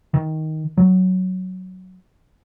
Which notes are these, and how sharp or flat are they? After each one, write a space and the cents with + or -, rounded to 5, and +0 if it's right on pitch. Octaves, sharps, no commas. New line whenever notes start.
D#3 +10
F#3 +5